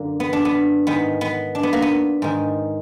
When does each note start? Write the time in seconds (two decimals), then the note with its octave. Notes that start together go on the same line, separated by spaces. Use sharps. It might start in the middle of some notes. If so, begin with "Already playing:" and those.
Already playing: F#2 D3 A#3
0.20 B3
0.33 D4
0.45 B3
0.87 G#2 D#3 B3
1.21 B3
1.55 D4
1.63 B3
1.73 A#3
1.82 B3
2.22 G#2 D#3